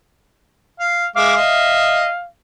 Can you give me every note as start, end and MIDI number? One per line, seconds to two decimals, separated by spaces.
0.80 1.06 77
1.16 1.36 56
1.16 1.36 76
1.16 2.27 77
1.16 1.36 86
1.36 2.08 75
1.36 2.08 76